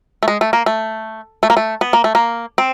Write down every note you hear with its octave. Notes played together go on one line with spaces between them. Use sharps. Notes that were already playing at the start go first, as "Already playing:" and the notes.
A3
G#3
A3
A#3
A3
A3
A#3
A3
B3
A#3
A3
A#3
C4